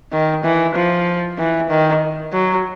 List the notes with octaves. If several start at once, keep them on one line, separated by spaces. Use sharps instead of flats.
D#3
E3
F3
E3
D#3
F#3